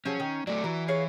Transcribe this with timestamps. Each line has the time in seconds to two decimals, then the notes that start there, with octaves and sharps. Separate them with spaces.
0.05 F3 F#3 C#4 G#4
0.20 D#3
0.47 F#3 A3 D5
0.64 E3 F#3
0.88 G#4 C#5 F5